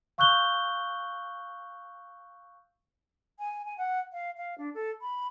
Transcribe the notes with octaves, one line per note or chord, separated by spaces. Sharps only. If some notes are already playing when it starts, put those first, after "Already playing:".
F5 C#6 E6 F#6 G6 G7
G#5
G#5
F#5
F5
F5
D4
A4
B5